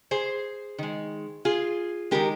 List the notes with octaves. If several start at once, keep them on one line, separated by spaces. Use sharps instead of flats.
G#4 C5
D#3 G#3
F4 G#4
D#3 G#3 G4 A#4